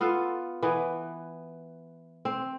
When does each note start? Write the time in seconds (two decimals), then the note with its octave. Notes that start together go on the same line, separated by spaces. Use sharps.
0.01 B3 F4 A4
0.63 E3 B3
2.25 C4